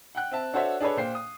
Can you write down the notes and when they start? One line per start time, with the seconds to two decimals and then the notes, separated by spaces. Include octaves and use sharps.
0.15 F#5 G5 F#6
0.31 C4 E5 A5
0.53 D4 F#4 A4 C5 C#5 E5
0.80 D4 G#4 A4 B4 C#5
0.97 A#2 C5 G5 C7
1.15 D#6